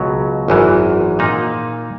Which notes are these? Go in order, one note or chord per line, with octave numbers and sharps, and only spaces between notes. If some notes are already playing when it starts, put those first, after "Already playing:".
Already playing: C#2 B2 F#3
G#1 F#2 E3
A#2 A#3 D#4